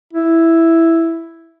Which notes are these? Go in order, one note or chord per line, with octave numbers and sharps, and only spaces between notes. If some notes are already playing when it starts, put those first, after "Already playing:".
E4